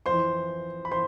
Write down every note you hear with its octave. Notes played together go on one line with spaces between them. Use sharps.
F2 E3 C5 C6
B5
E3 C5 C6